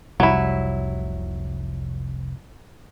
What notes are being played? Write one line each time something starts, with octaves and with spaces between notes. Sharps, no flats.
F1 C2 F#3 G3 E4